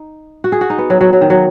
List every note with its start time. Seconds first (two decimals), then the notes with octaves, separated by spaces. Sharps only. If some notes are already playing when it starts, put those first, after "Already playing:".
Already playing: D#4
0.44 F#4
0.52 G#4
0.61 F#4
0.70 D#4
0.78 B3
0.90 F#3
1.01 F#3
1.13 F#3
1.21 D#3
1.30 F#3